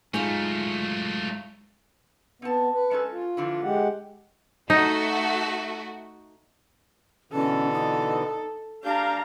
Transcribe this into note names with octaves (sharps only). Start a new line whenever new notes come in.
G#2 F#3 A3 D#4 F4
B3 C4 F#5 A5
B4
G#3 C#4 A4
F4
D3 E3 F3
G#3 G4 F#5
A3 D#4 F#4
B2 D3 E3 C#4 A4
D#4
D4 G4 F5 A#5 G6